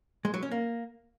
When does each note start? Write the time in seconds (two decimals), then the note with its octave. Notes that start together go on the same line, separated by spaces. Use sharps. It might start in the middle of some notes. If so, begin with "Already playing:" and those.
0.25 G#3
0.34 F#3
0.43 C#4
0.51 A#3